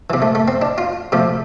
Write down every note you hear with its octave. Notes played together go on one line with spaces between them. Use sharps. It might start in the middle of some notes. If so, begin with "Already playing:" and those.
C3 E3
A3
A3
C4
D4
F4
C3 F3 A3